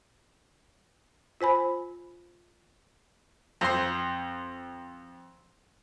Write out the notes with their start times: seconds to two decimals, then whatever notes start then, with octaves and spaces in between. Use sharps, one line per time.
1.41 F4 C5 G#5 B5
3.61 F2 C5 C6